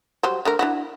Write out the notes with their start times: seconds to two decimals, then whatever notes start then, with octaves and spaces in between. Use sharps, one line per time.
0.23 F#3 G3 C5
0.45 D3 A3 A#4
0.59 D4 E4 F#4